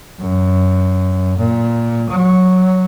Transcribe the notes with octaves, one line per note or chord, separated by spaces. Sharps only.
F#2
A#2
F#3